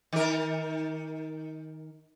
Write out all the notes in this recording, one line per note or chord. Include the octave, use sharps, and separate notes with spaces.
D#3 A#4